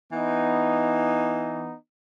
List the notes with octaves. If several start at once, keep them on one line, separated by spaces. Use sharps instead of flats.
E3 B3 D#4